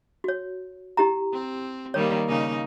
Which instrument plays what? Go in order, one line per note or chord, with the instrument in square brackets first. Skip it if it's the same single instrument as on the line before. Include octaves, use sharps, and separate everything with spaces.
[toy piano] F#4 C#5
E4 G4 A#5
[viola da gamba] C4
[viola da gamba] D#3 G3 A#3 [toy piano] C#5
[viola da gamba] C#3 A#3 D#4